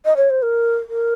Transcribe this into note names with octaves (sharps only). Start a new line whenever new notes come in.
D#5
C#5
C5
A#4
A#4